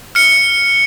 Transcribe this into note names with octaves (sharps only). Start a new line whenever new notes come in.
F6 C#7